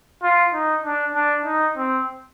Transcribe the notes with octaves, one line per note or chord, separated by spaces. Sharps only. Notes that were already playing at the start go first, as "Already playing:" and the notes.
F4
D#4
D4
D4
D#4
C4